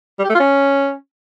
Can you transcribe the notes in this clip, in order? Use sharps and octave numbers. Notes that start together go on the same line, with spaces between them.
G3
G4
A3
F4
C#4